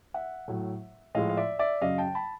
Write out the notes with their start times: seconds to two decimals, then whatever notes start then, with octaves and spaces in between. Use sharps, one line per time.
0.14 E5 F#5
0.48 A2 F#3
1.15 A2 F3 G#3 D#5 F5
1.29 F5
1.37 D5 E5
1.59 D5 E5
1.81 F#2 C#3 F#3 D#5 F5
1.98 G5 A5
2.15 A5 B5